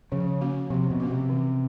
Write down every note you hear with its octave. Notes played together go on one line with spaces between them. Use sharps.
C#3 F3
A#3 C#4 F#4
C3 F3
B2
A#3 C#4 F#4
C3
E3